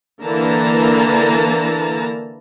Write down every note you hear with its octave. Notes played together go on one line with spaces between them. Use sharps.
D3 E3 A#3 A5 A#5